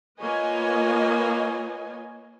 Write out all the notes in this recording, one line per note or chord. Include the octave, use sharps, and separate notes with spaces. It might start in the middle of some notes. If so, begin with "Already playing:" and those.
A#3 F4 B4 C#5 D#5 G#5